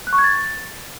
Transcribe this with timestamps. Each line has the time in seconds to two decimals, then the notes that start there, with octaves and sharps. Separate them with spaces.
0.07 F#6
0.13 C#6
0.18 G#6
0.24 A6